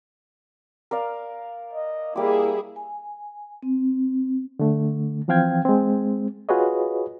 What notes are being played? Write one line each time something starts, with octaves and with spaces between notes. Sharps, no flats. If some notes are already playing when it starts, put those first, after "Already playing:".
A#4 D5 F5
D#5
G3 A#3 E4 G#4 D6
G#5
C4
D3 A3
E3 F3 C4 F5 G5 G#6
G#3 C4
F4 F#4 G#4 B4 C#5 D#5